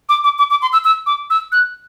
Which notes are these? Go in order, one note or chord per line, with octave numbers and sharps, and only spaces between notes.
D6
D6
D6
D6
C6
E6
E6
D6
E6
F#6